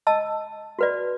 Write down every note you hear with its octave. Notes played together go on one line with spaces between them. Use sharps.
D#5 A5 E6
F#4 B4 D5